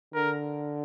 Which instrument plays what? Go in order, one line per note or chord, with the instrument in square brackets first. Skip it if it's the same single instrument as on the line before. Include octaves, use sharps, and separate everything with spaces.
[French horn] D3 [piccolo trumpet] A#4